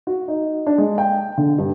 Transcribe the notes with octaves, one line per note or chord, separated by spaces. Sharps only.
F#4
D#4
D4
G#3
G5
D3
G2